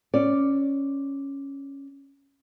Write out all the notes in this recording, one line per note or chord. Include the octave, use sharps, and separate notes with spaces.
C#4 D5